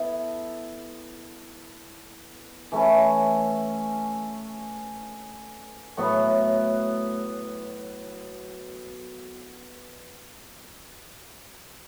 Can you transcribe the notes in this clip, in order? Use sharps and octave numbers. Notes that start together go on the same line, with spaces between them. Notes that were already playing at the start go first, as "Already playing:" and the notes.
Already playing: B3 E4 A4
E3 A3 C#4
A2 F#3 B3 F#4